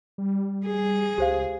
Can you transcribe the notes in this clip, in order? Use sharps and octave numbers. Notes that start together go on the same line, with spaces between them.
G3
G#4
C#2 G4 C5 F5